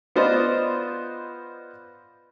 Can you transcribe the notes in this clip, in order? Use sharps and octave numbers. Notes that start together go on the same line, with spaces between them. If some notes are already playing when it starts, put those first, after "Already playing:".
B3 F4 C5 D5 D#5